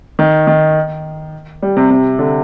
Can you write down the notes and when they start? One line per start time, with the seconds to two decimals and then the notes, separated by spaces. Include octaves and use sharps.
0.19 D#3
0.47 D#3
1.62 G3
1.77 C3
1.90 C3
2.19 D3